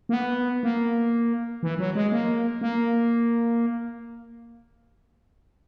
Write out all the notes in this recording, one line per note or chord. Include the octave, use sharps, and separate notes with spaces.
A#3
B3
A#3
E3
F#3
G#3
A#3
A#3